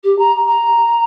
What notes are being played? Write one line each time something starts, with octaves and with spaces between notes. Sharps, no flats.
G4
A#5
A#5